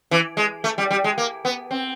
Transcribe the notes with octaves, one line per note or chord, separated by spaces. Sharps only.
E3
G#3
A3
G3
G3
G#3
A#3
B3
C4